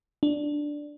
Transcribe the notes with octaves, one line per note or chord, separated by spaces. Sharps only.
D4